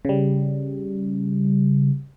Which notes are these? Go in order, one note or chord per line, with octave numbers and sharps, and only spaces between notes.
C#3 G3